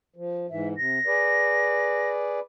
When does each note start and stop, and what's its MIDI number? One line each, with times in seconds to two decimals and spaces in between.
0.16 0.47 53
0.50 0.74 44
0.50 0.74 52
0.50 0.69 76
0.77 0.99 48
0.77 2.09 94
1.07 2.40 68
1.07 2.40 71
1.07 2.40 74